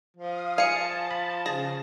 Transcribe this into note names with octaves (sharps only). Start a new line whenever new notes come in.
F3 F5 D#6
G#4 F5 G#5 A5 C#7
B5
C#3 G#4 A#6